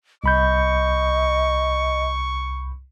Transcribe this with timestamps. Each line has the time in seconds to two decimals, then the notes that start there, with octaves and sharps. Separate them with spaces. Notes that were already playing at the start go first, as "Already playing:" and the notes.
0.24 C2 D#5 B5 C#6 G6